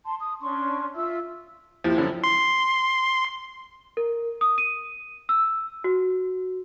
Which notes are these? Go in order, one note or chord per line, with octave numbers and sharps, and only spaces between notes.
A5 C6
D#6
C#4 D4 C6 C#6
F4 E5 E6
D#2 F3 E4 G4
F#2 D3 F3 C#4
C6
A#4
D#6
D#7
E6
F#4